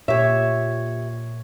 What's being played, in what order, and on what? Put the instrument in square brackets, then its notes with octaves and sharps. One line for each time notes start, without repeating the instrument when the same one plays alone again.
[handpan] A#2 C#5 [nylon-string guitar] G4 E5